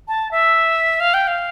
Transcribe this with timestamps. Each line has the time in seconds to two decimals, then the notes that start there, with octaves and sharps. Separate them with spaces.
0.08 A5
0.31 E5
1.00 F5
1.14 G5
1.27 F5